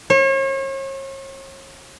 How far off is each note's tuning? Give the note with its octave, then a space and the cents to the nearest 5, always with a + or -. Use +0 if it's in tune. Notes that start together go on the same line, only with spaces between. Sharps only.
C#5 -40